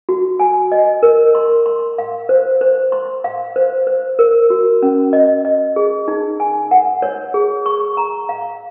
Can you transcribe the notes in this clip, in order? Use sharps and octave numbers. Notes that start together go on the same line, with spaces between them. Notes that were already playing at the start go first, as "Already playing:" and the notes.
F#4
G#5
D#5
A#4
C6
C6
F5
C5
C5
C6
F5
C5
C5
A#4
F#4
C#4
D#5
D#5
G#4
D#4
G#5
F#5
C#5
G#4
C#6
A#5
F5